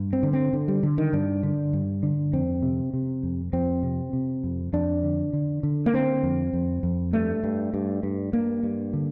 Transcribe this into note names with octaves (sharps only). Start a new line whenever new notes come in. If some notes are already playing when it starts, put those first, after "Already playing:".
Already playing: G2
C4
D3
C4
D3
G3
D3
D#3
G2 D4
D3
G2
D3
F2 C4
C3
C3
F2
F2 C4
C3
C3
F2
F2 D4
D3
D3
D3
A#3
D3 C4
F2
F2
F2
G2 A3
G2
G2
G2
G2 A#3
G2
D3